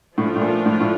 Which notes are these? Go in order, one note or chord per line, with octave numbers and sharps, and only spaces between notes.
A2 F3 A3 D4 F4
A2
A#2
A2
A2